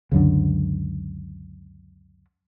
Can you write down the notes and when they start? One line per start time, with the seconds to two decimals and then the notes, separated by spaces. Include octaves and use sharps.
0.12 C#2 F#2 D3